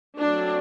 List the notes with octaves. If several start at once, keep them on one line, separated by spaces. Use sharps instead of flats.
F#3 A3 C4 D4